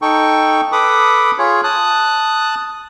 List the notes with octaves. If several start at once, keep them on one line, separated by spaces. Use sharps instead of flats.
D#4 A4 G5 C#6
A4 B4 B5 D6 D#6
F4 G#4 C#5
A5 D#6 F#6